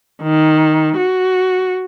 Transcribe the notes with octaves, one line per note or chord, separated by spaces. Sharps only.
D#3
F#4